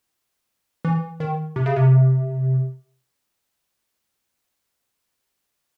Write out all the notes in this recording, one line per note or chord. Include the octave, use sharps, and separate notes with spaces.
E3
D#3
C3
C#3
C3